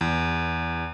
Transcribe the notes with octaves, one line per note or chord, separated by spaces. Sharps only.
E2